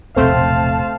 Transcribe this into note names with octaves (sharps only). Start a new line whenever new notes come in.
E1 A#1 C3 A3 C4 C5 F5 A5